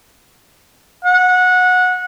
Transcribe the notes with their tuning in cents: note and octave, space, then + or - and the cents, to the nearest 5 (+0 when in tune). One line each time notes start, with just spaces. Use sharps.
F#5 -20